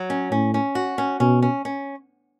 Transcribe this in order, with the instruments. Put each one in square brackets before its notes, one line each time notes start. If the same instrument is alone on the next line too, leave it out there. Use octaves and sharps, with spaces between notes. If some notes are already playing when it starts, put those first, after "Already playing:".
Already playing: [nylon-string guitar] F#3
C#4
[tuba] A2 [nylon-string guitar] C#4
[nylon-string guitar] C#4
F#4
C#4
[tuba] B2 [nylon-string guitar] C#4
[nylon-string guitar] C#4
C#4